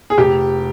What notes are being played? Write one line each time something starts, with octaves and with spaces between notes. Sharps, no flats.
G#4
F1 G4